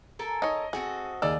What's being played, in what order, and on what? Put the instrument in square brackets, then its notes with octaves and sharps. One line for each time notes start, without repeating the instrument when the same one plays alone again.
[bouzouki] A4 A#4 G#5
[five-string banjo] D#4 C#5 [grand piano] D#5
[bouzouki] C4 F#4 A4 [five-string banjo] G#4
[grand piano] D#2 D5 E6 [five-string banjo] D#4 [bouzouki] G#4